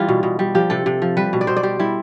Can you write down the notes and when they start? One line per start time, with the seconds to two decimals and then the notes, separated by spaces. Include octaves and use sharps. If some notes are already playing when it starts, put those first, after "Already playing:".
Already playing: E3 G3 F4
0.08 B2
0.23 B2
0.39 G3
0.55 F3 G4
0.70 C3 A4
0.86 C3
1.02 F3
1.17 G3 B4
1.33 B2
1.41 D5
1.47 B2 C5
1.56 D5
1.63 G3 C5
1.79 G3 E4